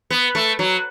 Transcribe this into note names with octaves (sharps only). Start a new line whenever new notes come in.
B3
A3
F#3